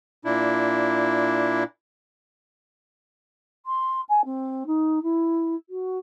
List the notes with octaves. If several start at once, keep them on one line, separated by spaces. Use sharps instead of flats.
A#2 D4 E4
C6
G#5
C4
D#4
E4
F#4